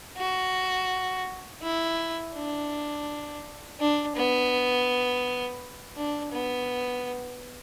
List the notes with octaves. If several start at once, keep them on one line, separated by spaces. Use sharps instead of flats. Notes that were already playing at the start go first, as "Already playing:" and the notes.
F#4
E4
D4
D4
B3
D4
B3